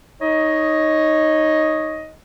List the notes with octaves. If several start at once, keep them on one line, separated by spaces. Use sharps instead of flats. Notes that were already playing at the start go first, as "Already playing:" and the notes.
D#4 C#5 D#5